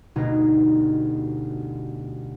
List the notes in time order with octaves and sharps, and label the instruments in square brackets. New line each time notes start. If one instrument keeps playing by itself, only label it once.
[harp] G1 D2 B2 D#4 A#5 G#6